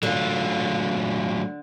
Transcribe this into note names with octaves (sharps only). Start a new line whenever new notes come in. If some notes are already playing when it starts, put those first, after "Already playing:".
D3 F#3 A3 F4